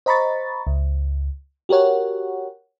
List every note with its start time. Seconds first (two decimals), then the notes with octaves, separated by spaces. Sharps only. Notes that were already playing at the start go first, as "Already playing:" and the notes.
0.06 C5 D#5 A#5 B5 C#6 A6
0.67 C#2
1.69 F#4 G4 A#4 C#5 F#5